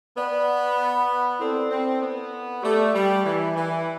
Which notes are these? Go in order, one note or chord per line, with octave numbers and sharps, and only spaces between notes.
B3 B4 D5 G5
C4 E4 A4 D5 A5
C4
B3
A3 G4 D5 A5 D6
G3
E3
E3